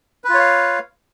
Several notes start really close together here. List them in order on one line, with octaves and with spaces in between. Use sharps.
B4 F4 C#5 F5